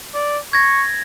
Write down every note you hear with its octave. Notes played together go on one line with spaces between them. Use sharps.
D5
C#6 G#6 A#6